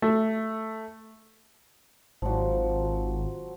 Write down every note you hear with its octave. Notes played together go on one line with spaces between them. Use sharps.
A3
G#1 F3 F#3